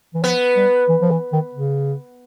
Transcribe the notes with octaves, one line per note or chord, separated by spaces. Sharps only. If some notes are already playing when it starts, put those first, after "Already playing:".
E3
F3 B3
G3
E3
F3
E3
D#3
C#3